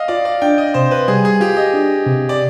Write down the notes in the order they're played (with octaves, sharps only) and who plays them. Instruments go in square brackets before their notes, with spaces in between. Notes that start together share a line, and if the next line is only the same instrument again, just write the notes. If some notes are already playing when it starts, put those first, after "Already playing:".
Already playing: [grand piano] D#5 F5
[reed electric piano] F4 [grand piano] D5
[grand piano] D5
[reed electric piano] D4 [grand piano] G5
[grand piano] D#5
[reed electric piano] C3 [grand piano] C5
[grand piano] B4
[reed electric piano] G3 [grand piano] G#4
[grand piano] G#4
[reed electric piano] F4 [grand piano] G4
[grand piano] D#5
[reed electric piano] D4
C3
[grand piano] D5